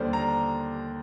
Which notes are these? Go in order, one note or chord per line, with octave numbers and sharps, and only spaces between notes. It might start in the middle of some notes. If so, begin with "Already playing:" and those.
Already playing: D#2 D3 G3 C5 D5
A#5